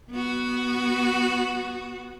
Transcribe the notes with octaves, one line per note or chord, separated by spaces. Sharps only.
B3 F#4